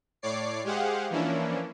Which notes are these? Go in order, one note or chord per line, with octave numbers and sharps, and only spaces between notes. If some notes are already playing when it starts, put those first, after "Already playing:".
A2 C#5 D5 D6 C7
G#3 G4 G#4 C5 F5 F#5
E3 F3 A#3 C#4 D4 E4